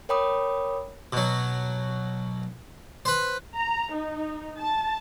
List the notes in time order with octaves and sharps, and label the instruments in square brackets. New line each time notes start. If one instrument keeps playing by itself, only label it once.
[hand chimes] A#4 C#5 G5 B5 D6 D#6
[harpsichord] B2 F#3
B4 C5
[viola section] A#5
D#4
A5